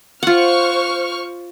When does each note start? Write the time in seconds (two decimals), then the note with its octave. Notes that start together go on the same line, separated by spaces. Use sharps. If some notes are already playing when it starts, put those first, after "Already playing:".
0.23 F4 C5 F#5 C#6 F6